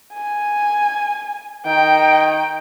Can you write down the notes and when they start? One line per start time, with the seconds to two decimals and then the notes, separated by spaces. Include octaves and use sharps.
0.14 G#5
1.66 D#3 G5